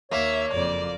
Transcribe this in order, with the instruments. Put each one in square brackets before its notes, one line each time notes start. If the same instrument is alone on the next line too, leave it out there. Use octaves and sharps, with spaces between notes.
[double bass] D#2 [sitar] A#3 [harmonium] C#5 [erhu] E5
[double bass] F#1 F2 [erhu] D5